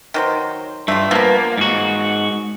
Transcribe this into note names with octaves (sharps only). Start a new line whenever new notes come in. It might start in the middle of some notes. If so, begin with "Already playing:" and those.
D#3 F#3 C5
G2 A3 F4
F3 A#3 B3
G#2 F#4